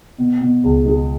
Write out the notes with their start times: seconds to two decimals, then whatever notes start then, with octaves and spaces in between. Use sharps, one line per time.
0.18 B2
0.41 B2
0.64 C#2
0.86 G#3